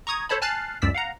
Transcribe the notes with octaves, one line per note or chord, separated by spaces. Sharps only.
A#5 C#6 D#6 G#6
A4 C5 C#5 A5 B5
G#5 A5 F6 F#6 A6 C7
C#2 F#2 D5 E6 B6
F5 F#5 A#5